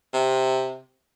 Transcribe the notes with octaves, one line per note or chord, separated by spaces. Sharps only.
C3